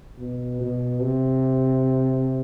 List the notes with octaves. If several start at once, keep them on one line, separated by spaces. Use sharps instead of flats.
B2
B2
C3